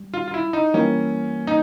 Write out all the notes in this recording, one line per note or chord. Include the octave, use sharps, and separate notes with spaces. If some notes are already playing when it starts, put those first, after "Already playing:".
Already playing: G3
F4
F4
E4
D#4
E3 G3 A#3 C#4
D#4